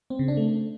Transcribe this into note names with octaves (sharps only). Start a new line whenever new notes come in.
C4
C#3
D4
A3